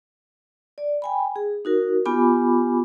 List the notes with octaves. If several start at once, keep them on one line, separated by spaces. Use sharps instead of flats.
D5
G5 G#5 B5
G#4
D#4 F#4 A#4
B3 F4 G4 G#5 B5 D6